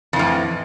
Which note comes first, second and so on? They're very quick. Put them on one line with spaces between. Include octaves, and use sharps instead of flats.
F2 E3 A2